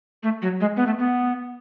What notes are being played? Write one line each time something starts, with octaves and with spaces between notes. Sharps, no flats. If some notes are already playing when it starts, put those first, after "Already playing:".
A3
F#3
G#3
B3
A3
B3